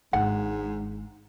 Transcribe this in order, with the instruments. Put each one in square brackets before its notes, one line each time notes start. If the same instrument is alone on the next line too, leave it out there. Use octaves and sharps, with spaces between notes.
[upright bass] G#1 D4 [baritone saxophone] G#2 [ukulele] F#5